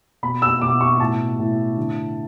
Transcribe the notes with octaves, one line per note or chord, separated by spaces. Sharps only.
B2 B5
E6
B2 D6
C#6
A2 A5
A2
D3